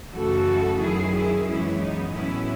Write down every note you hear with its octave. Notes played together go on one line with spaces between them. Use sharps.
F#2 C#3 E3 A3 F#4 A4
F#2 D#3 F#3 E4 G#4
E4 G#4
F#2 E3 G#3 B3 C#4 E4
D#4
A2 F#3 B3 C#4 E4